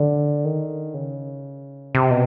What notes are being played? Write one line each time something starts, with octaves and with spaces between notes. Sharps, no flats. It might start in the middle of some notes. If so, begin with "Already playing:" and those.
Already playing: D3
D#3
C#3
C3
B2